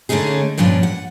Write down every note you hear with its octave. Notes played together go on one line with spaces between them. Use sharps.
D3 A3 C4 C#4 D#4 G#4
G2 A#2 F3 C#4 D4
F#5